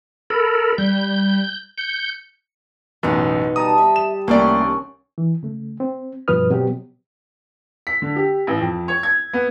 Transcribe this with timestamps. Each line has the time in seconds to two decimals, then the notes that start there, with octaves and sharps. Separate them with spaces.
0.30 A4 A#4 B5
0.78 G3 G6
1.78 G6 C#7
3.03 A1 F#2 B2 B3 D#4
3.56 G3 A5 A#5 D#6
3.78 E5
3.96 E7
4.28 C2 D#3 G3 A3 A#3 C#4 D5
5.18 E3
5.43 C#3 A3
5.80 C4
6.28 G2 B2 F3 B4 D#6 F6
6.50 B2 F#3 B3 C4 G4
7.87 B6
8.02 D3
8.16 G4
8.47 A1
8.61 F2
8.88 C#5
9.03 G#6
9.33 B3